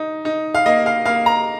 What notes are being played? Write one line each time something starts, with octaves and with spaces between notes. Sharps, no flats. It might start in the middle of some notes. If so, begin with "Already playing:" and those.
Already playing: D#4
D#4
F5
A#3 D#5
F5
A#3 F5
A#5